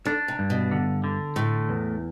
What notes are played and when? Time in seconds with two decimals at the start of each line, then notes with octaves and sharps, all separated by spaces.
0.05 D3 D4
0.28 C3
0.39 G2
0.50 B2
0.71 D3
1.04 D3
1.36 A2 A3
1.69 E2